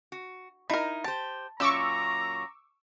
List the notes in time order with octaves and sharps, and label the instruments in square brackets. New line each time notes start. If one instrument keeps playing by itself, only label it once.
[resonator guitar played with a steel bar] F#4
[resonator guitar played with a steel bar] D#4 [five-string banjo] E4 A#4
[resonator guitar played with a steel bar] G4 C5 [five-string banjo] A5
[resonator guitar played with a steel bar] F#2 A#2 F4 [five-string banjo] C#4 [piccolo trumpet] A#5 [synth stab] C#6 D6 E6